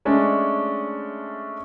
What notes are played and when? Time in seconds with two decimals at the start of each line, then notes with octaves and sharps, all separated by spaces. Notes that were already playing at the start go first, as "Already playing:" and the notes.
0.05 G#3 A3 C#4 D4